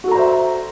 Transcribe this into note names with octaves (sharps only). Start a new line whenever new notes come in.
F#4 A4 C5 E5 A#5